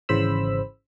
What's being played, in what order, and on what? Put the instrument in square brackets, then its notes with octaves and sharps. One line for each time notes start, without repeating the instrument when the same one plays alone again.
[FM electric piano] G#1 C#3 E3 C5 B5 E6